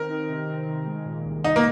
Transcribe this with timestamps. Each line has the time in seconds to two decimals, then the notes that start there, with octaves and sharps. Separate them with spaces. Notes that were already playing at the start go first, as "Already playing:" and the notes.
Already playing: D#3 C4 A#4
0.09 D#4
0.29 C3
0.48 C4
0.67 D#3
0.86 G#3
1.06 A#2
1.25 C2
1.44 C2 D#4
1.56 A#3